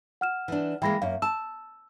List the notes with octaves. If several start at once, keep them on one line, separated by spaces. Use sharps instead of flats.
F#5 F6 E7
E3 D4
E3 G#3 A#3 G5 B5 A#6
F#2 A#3 E5 F5
A5 E6